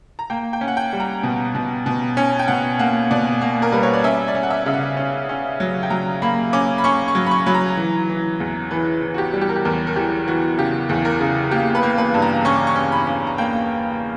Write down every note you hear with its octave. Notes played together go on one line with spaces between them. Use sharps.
A#5
A#3 G5
G5
C#4
F#5
G5
G3
A#5
B2
B2
B2
C#4
G5
B2 F#5
A#3 F#5
B2 D5
A#3
A#4
G3 B4
C#5
D5
C#4 E5
D5
C#4
F#5
E5
C#3 E5
F#5
C#4
C#4
F#3
G5
F#3 A#5
A#3 B5
C#4 D6
B5
C#4 C#6
C#6
F#3
B5
C#6
F#3 B5
A#5
E3
E3
E2
E3 B4
E3
F#4
G4
G3
G4
A#4
G4
E2 A#4
A#4
E3 G4
E3 F#4
C#3 G4
E2
A#4
C#3
A#3 G4
B4
A#3
B4
G2
A#5
C#4 C#6
D6
C#6
C#4
B5
C#4
A#5
A#3 G5